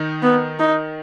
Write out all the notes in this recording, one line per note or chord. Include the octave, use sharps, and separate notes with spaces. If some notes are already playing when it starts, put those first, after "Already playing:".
Already playing: D#3 D#4
B3
D#4